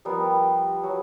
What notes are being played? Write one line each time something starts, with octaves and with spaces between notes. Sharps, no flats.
F3 G3 B3 A#4
F#3